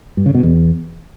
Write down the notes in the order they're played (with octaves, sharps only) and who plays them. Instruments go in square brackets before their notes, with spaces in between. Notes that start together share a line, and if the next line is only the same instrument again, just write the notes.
[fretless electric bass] G2
C#3
B2
E2